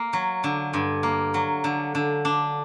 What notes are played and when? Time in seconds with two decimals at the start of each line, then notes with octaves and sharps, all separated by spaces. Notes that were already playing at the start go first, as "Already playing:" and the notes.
Already playing: A#3
0.13 F#3
0.44 D3
0.74 G2
1.03 A#3
1.34 F#3
1.64 D3
1.95 D3
2.25 D4